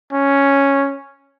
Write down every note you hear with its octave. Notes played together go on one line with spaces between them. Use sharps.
C#4